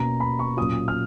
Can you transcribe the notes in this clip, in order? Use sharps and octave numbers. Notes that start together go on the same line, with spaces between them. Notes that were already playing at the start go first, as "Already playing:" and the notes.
Already playing: B2 A#3 C#4 A#5
B5
C#6
A#2 F#3 C#4 F4 D#6
F6